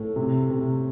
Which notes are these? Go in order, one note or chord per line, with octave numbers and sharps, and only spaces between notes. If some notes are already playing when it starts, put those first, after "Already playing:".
Already playing: A2
C3
C3